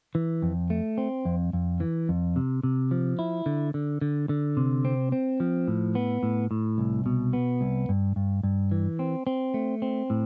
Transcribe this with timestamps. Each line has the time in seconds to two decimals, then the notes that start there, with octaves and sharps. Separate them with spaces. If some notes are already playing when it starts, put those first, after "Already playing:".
0.15 E3
0.42 F2
0.70 A3
0.98 C4
1.25 F2
1.53 F2
1.80 E3
2.09 F2
2.36 C3
2.63 C3
2.91 F3
3.19 E4
3.46 D3
3.74 D3
4.01 D3
4.29 D3
4.57 C3
4.85 C4
5.12 C4
5.40 F3
5.68 A2
5.95 B3
6.23 A2
6.51 A2
6.78 C2
7.06 B2
7.33 B3
7.61 C2
7.89 G2
8.16 G2
8.43 G2
8.71 E3
8.99 C4
9.27 C4
9.54 A3
9.82 C4
10.10 A2